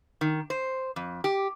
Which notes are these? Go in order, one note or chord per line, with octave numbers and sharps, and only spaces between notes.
D#3
C5
F2
G4